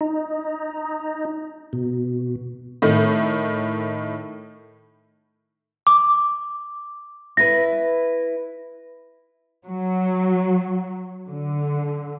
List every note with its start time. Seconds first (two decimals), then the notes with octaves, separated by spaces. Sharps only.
0.01 D#4
1.73 B2
2.82 A2 D#3 A3
5.87 D6
7.37 E4 B4 A#6
9.66 F#3
11.30 D3